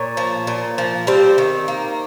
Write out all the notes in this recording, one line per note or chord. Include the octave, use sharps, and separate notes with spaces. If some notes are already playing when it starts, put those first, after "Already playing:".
Already playing: A#2 C#5
F3
A#2
F3
G3 C4 C5
D#3
A#3